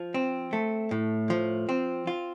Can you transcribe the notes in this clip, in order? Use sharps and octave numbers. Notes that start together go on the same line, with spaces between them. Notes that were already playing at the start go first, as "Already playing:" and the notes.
Already playing: F3
C4
A3
A2
F3
C4
F4